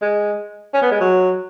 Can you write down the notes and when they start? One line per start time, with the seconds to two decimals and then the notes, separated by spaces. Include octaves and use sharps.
0.02 G#3
0.74 C#4
0.82 B3
0.92 G#3
1.01 F#3